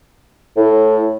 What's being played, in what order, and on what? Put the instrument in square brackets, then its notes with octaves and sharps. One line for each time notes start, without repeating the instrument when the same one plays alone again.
[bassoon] A2